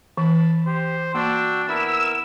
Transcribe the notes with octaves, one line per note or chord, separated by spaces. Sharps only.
E3 A5 B5
G4 C5
A#3 D4 F#4 G5 E6
B3 E4 A#4 E6